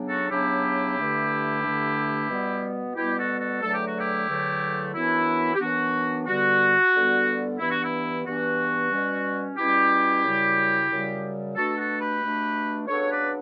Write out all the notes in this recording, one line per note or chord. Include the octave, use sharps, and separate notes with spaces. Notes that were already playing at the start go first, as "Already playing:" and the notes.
Already playing: C#3 F#3 B3 D4
F#4 A4
C#3 F#3 B3 D4 E4 G4
G2 D3 A3 D4
G2 D3 A3 D4
B2 G3 B3
B2 G3 B3 E4 G4
F#4 A4
F#4 A4
E2 D3 F#3 A3 A4
G4
F#4
E4 G4
E2 D3 F#3 A3
F#2 E3 B3 D4 E4
G4
F#2 E3 B3 D4 F#4
G2 D3 G3 B3 F#4
G2 D3 G3 B3
G2 E3 B3 D4 E4
F#4
E4
G2 E3 B3 D4 F#4
B2 G3 C#4
B2 G3 C#4 E4 G4
F#2 C#3 G3
F#2 C#3 G3
B2 A3 D4 F#4 A4
F#4 A4
G4 B4
B2 A3 D4
C#3 F#3 B3 D4 A4 C#5
B4 D5